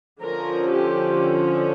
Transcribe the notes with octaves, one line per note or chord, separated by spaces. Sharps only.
D3 F3 C#4 A#4
G4